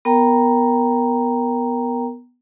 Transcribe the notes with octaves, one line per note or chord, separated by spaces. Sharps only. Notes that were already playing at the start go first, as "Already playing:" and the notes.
B3 A#4 G5 A#5